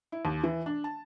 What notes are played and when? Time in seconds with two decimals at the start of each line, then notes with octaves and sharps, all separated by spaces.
0.12 E4
0.25 D#2
0.43 E3
0.66 D4
0.84 A5